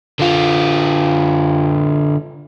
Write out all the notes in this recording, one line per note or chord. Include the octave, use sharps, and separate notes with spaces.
D3 F4